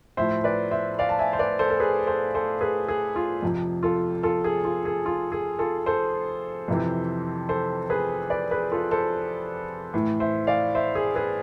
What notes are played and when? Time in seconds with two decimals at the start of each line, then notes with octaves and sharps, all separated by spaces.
0.17 A2 F3 C5 E5
0.44 B4 D5
0.71 C5 E5
0.99 D5 F5
1.09 A5
1.19 E5 G#5
1.33 C5
1.39 B4 D5
1.59 A4 C5
1.70 A4
1.80 G#4 B4
2.07 A4 C5
2.35 A4 C5
2.61 G#4 B4
2.88 G#4
3.16 F4
3.42 F2 C3 F3
3.83 F4 A4
4.23 F4 A4
4.44 G#4
4.65 F4
4.85 G#4
5.06 F4
5.32 G#4
5.59 F4 A4
5.86 A4 C5
6.68 F2 C3 E3
7.49 A4 C5
7.90 G#4 B4
8.30 B4 D5
8.51 G#4 B4
8.71 F4 A4
8.91 A4 C5
9.94 A2 E3
10.20 C5 E5
10.47 D5 F5
10.75 C5 E5
10.95 G#4
11.15 G#4 B4